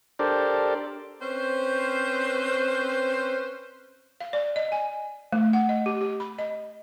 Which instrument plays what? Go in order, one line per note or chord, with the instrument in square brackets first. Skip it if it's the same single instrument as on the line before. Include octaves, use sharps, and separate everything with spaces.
[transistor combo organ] D4 G4 A4 A#4 C5 D5
[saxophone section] C4 C#4 B4 C5
[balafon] F5
D5
D#5
G#5
A3
F#5
D#5
G4
G4
B5
D#5